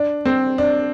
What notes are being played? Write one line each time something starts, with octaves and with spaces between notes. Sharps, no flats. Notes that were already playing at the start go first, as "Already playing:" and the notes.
Already playing: D4
C4
D4